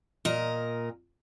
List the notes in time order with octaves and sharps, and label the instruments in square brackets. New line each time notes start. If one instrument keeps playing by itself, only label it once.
[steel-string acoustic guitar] A#2 A#4 D#5